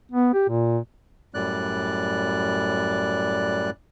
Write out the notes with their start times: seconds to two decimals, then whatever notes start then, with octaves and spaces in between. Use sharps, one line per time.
0.12 B3
0.34 G4
0.48 A#2
1.34 F#2 A2 G3 D5 F#6